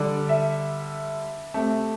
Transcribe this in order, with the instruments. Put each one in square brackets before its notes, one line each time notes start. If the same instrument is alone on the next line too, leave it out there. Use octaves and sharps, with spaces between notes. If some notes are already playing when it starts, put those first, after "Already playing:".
Already playing: [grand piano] D3 G3 D5
E5
C3 A3